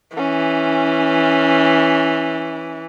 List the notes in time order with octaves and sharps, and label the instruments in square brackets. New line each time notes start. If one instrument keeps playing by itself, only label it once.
[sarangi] E3 [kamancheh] C#4